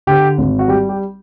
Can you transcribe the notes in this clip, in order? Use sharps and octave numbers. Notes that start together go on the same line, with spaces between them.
D3 G4
G#1
F#4
G3 G4
G4